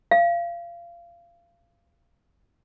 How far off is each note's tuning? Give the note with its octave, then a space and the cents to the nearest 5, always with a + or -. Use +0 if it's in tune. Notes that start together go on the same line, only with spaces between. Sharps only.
F5 -25